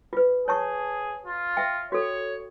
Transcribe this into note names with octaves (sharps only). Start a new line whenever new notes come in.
F4 B4
G#4 C#5 A5 C#6
F4
E5 G5
F#4 A4 C#5